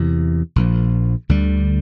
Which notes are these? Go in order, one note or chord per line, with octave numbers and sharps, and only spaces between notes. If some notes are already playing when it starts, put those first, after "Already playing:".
Already playing: E2 C3 E3
A#1 A#2 F3
D2 D3 G3